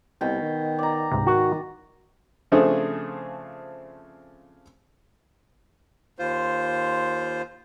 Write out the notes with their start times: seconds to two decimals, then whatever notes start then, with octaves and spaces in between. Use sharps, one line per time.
0.21 C2 B2 G5
0.41 D#3
0.79 D5 A#5
1.12 C#2 G#2 C3
1.27 D#3 F#4
2.52 C#3 F3 A3 C4 D4 G#4
6.19 D#2 F4 C5